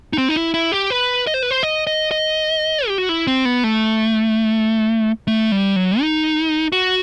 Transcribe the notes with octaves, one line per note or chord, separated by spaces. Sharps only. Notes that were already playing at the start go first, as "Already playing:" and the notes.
D#4
C4
D#4
E4
E4
G4
B4
D#5
C5
B4
C5
D#5
D#5
D#5
G4
F#4
E4
C4
B3
A3
A3
G3
F#3
D#4
F#4